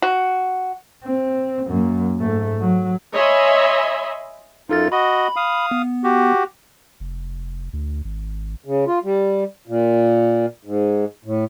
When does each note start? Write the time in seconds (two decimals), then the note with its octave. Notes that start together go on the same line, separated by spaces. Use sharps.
0.02 F#4
1.05 C4
1.68 F#2 A#3
2.17 G#2 A3
2.61 F#3
3.13 C#5 D#5 E5 G#5 B5 C6
4.69 F#2 D#4 F4 A4 A6
4.92 F#4 D#5 B5
5.36 F5 B5 D#6
5.71 B3
6.04 F#4 G4
7.00 F1
7.73 D2
8.05 G#1
8.65 C#3
8.87 F4
9.04 G3
9.68 A#2
10.65 G#2
11.25 A2